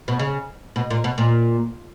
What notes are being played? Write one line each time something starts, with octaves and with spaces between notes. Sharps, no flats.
B2
C#3
B2
A#2
B2
A#2